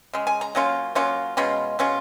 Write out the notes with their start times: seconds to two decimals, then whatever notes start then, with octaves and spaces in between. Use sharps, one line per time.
0.13 C#3 G#3
0.27 G#5
0.41 A#5
0.55 F#3 A#3 C#4 F4
0.95 F#3 A#3 C#4 F4
1.37 B2 G#3 C#4 F4 B5
1.79 B2 G#3 C#4 F4